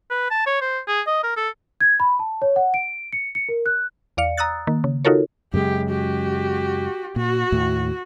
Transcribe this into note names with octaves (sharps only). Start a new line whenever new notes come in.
B4
A5
C#5
C5
G#4
D#5
A#4
A4
G#6
B5
A5
C#5
F#5
D7
C#7
C#7
A#4
F#6
E2 D5 F5 C#7
A#5 D#6 E6 F#6 A6
D#3 A#3
C#3
D#4 F4 F#4 A4 A#4 C#5
F#2 C#3 G#3 G4
F#4 G4
A#2 F#4
D#2 A2